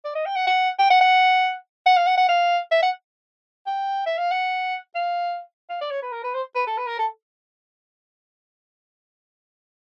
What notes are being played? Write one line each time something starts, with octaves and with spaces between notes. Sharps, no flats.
D5
D#5
G5
F#5
F#5
G5
F#5
F#5
F#5
F5
F#5
F#5
F5
E5
F#5
G5
E5
F5
F#5
F5
F5
D5
C#5
B4
A#4
B4
C5
B4
A4
B4
A#4
A4